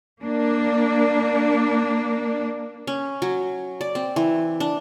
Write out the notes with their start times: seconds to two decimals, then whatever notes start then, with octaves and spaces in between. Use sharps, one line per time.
0.23 A#3 D4
2.87 C#4
3.22 F#3
3.81 D5
3.95 C4
4.16 E3
4.60 D4